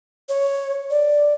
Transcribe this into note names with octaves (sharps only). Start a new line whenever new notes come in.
C#5
D5